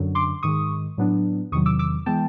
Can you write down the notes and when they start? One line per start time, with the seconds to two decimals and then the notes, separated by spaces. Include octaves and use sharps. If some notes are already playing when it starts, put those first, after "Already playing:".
Already playing: F#2 D3 F#3
0.15 C6 D6
0.43 G#2 D#3 G#3 C#6 D#6
0.98 A2 F#3 B3 D4
1.52 E2 C3 D#3 F#3 C#6 D#6
1.66 D6 E6
1.79 D6 E6
2.06 E3 G#3 B3 G5 A5